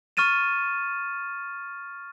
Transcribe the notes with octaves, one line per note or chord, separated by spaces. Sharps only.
C#6 F6 A6 D#7 E7